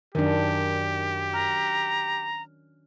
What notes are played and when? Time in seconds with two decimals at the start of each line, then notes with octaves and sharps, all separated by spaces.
0.15 F#2 D#3 D4 G4
1.33 A#5 F6